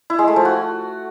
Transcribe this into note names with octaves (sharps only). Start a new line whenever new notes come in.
E4
G#3
A3
F3
F#4